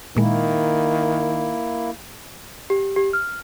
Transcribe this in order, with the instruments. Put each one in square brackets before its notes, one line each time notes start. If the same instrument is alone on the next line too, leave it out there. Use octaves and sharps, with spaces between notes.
[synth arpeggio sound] A#2 G#3 [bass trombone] D#3 [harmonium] A#3 E4
[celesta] G4
G4
F6